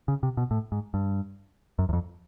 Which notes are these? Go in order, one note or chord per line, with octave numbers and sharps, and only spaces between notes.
C#3
C3
B2
A2
G#2
G2
F#2
E2
F2